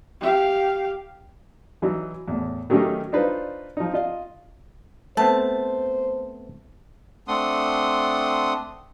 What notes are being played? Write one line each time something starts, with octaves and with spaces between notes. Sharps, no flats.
G4 F5
E3 F#3 D#4
E2 A2
D#3 F#3 A3 C#4 D#4 G4
D4 D#4 F4 B4 C5
F3 D#4
F4 D#5 F5
A3 B3 C4 C5 A5
A3 C4 D4 F#5 C6 D#6